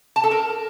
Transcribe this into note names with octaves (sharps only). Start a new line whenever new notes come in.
A5
A4
A#4